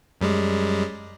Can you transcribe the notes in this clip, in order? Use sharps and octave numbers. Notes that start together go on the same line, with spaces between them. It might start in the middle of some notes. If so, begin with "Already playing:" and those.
F#2 G3 G#3